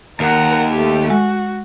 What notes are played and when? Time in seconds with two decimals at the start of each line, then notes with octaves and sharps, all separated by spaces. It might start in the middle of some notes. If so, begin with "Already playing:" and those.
0.20 D#2 A#4 F#5
0.72 A3 G4
1.10 G#3 F#4